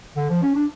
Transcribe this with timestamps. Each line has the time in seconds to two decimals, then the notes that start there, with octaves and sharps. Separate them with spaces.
0.17 D3
0.30 F3
0.43 C#4
0.55 D4